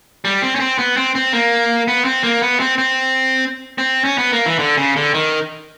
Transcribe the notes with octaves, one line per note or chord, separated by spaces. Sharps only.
G3
C4
C#4
C4
B3
C4
C4
A#3
B3
C4
A#3
B3
C4
C4
C4
C#4
B3
A#3
E3
D3
C#3
D3
D#3